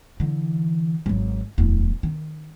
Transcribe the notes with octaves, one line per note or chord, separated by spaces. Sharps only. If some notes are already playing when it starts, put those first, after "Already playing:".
D3 E3
G#1 F#3
D1 E2
D#3